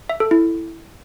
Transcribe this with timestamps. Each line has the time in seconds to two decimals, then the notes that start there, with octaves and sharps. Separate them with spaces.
0.09 E5
0.20 A4
0.31 E4